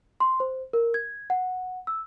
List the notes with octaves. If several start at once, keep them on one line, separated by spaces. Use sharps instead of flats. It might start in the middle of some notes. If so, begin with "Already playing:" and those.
C6
C5
A#4
G#6
F#5
E6